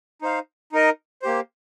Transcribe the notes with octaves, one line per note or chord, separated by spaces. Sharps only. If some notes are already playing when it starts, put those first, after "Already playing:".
D#4 C5 F5
D#4 A#4 D#5
A#3 G4 C5